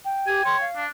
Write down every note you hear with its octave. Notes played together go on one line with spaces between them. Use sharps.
G5
G4 G#5
C#5 C6
F5
D4